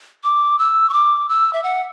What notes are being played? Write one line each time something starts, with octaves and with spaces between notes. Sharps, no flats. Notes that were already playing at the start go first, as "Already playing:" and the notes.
D6
E6
C#6
D6
E6
E5
F#5